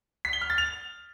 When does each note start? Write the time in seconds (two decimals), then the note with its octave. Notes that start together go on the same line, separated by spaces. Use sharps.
0.25 B6
0.33 G7
0.41 F6
0.50 A6
0.58 F7